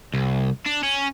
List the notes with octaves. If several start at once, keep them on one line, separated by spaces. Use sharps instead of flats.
C2
D4
C#4